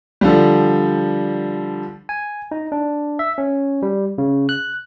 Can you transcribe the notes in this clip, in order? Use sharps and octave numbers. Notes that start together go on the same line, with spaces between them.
D3 F3 G3
G#5
D#4
D4
E5
C#4
G3
C#3
F#6